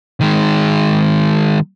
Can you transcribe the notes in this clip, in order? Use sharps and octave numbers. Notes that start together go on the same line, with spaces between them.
D#3 G#3